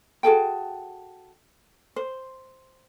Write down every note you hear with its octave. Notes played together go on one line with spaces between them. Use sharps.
F#4 G#4 A4 G5
C5